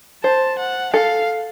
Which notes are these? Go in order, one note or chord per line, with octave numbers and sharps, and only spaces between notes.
C5 A5
F#5
A4 F5